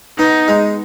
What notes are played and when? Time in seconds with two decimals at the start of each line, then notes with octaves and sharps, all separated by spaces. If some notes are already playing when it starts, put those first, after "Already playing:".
0.18 B3 D#4
0.48 G#3